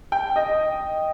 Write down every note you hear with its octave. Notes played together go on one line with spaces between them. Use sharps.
G5
D#5